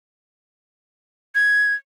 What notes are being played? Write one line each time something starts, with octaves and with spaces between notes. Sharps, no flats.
G#6